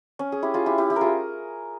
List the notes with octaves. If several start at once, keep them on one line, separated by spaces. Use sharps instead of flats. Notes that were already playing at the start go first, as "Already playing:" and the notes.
C#4
G#4
E4 G4
F4 G#4
E4 G4
E4 G4
E4 G4
F4 G#4 A#4